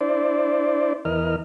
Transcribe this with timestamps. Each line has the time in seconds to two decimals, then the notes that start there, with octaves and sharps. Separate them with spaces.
0.01 D4 E4 C5 D5
1.05 E2 E3 A#4 D#5 F6